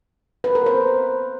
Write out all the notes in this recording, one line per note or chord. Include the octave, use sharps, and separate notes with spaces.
B4
A#4
C5